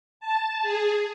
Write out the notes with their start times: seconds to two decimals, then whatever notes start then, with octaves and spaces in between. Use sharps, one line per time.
0.20 A5
0.61 G#4